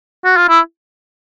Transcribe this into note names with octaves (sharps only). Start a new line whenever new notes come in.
F#4
F4
E4